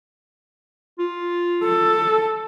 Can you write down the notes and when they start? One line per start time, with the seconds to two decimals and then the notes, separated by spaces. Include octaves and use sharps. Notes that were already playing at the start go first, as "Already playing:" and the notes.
0.99 F4
1.63 A4